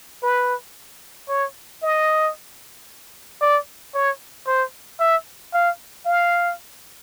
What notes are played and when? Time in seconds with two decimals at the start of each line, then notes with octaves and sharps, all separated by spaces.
0.23 B4
1.29 C#5
1.83 D#5
3.41 D5
3.94 C#5
4.47 C5
5.00 E5
5.54 F5
6.06 F5